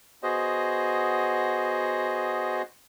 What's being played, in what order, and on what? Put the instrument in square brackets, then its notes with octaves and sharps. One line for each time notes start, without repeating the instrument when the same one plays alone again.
[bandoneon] B3 F#4 G#4 C5 D#5